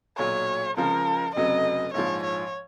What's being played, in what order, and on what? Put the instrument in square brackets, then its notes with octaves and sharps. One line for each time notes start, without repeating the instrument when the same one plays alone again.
[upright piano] B1 A#2 F#3 [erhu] C#5
[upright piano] C#2 C#3 F3 [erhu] A#4
[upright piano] F1 F2 C#3 F#3 [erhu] D#5
[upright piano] A#1 G#2 F3 [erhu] C#5
[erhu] C#5